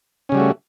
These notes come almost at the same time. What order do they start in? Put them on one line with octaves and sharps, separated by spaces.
C#4 C#3 G3 F#4 A3